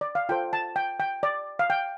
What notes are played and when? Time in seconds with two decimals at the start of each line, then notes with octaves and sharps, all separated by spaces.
0.01 D5
0.15 F5
0.29 F4 A4 C5 G5
0.53 A5
0.76 G5
1.00 G5
1.23 D5
1.59 F5
1.70 G5